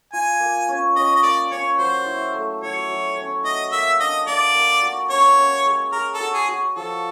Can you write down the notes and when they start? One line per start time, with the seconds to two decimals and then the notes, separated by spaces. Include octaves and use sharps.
0.13 F4 G#5
0.40 A#3
0.69 C#4
0.96 C#4 D#5
1.16 D#5
1.23 A#3 D5
1.51 C#4 C#5
1.78 F#3 C5
2.06 E4
2.33 A3
2.61 F#3 C#5
2.89 F#3
3.17 C#4
3.44 F#4 D#5
3.72 A#3 E5
4.00 D4 D#5
4.27 A#3 D5
4.55 A#3
4.82 F#4
5.10 C#4 C#5
5.38 C#4
5.66 G#3
5.92 G#3 A#4
6.14 A4
6.20 F#4
6.34 G#4
6.48 F#4
6.75 F3 A4